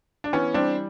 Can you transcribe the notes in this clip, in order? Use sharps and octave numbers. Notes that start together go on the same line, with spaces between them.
D4
E3 B3 C#4
G3 C4 D4